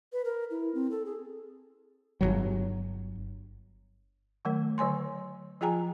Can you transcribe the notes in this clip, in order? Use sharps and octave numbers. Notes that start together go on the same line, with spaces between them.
B4
A#4
E4
C4
A4
G#4
G1 C2 F#3
D#3 F#3 A3 A#4
D3 F#3 C#5 G#5 C6
F3 F4 G#4 G5 G#5 A#5